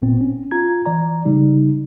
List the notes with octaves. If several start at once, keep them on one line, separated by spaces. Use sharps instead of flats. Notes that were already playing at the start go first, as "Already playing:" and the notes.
G1 A#2 B3 C4
C#4
F4 A#5 G#6
E3 D5 A#5
C#3 G3 D#4